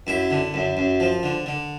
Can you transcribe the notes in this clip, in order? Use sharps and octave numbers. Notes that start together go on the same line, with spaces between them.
F#2 E4
D3
F#2
F#2
F3
D3
D3